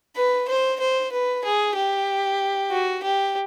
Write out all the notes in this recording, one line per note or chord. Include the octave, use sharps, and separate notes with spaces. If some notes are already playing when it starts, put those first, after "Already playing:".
B4
C5
C5
B4
G#4
G4
F#4
G4